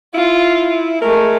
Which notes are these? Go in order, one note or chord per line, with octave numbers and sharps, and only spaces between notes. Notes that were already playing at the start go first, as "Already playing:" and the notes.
E4 F4
G#3 A3 A#4